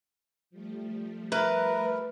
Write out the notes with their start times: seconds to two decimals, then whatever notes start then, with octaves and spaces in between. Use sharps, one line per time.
0.50 F3 G3 A3
1.32 A#4 B4 E5 B5